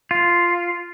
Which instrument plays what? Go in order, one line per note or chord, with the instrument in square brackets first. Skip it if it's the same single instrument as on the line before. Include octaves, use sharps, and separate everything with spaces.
[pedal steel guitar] F4